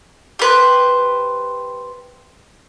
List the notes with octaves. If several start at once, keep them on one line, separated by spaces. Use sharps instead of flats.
G4 B4 C5